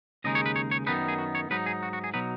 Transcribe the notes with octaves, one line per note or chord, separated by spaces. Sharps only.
D#2 C#3 G#3 D#4 D#5
C#5
B4
C#5
C#5
F#2 D#3 B3 D#4 B4
G#4
F#4
C#5
G#2 F#3 D#4 B4
G#4
F#4
F#4
G#4
B2 F#3 D#4 B4